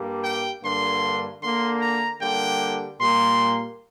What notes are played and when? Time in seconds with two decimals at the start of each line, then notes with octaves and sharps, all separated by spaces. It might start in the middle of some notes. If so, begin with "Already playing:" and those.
Already playing: G2 G3 A#3
0.23 G5
0.63 G2 D3 A#3 C6
1.41 D3 A#3 C6
1.81 A#5
2.20 D3 G3 A#3 G5
2.99 A#2 G3 A#3 C6